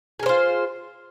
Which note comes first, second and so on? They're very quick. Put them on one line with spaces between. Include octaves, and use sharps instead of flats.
G#4 A#4 C5 F4